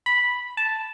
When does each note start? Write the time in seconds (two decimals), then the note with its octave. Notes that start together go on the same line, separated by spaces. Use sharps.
0.06 B5
0.57 A5